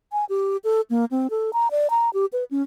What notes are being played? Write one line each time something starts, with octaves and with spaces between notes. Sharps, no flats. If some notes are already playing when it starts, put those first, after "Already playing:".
G#5
G4
A4
A#3
C4
A4
A#5
D5
A#5
G4
B4
C#4